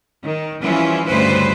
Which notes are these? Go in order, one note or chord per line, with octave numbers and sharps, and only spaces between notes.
D#3
E3 F3 G3 C#4 E4 F4
D2 G2 C#3 E4 B4 C5